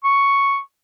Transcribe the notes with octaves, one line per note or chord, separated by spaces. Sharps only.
C#6